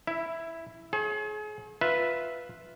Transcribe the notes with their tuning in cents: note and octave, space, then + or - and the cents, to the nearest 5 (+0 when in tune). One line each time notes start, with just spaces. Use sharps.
E4 +0 E5 +20
G#4 +35 C#5 -40
F4 +0 B4 +0 E5 +0